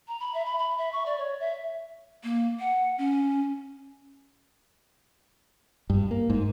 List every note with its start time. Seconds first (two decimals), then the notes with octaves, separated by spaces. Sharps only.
0.08 A#5
0.20 B5
0.34 E5
0.46 B5
0.59 B5
0.78 E5
0.92 C#6
1.06 D5
1.18 C#5
1.40 E5
2.24 A#3
2.60 F#5
2.98 C#4
5.90 G2
6.11 A#3
6.30 G#2